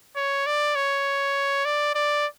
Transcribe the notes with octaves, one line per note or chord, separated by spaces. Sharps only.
C#5
D5
C#5
D5
D5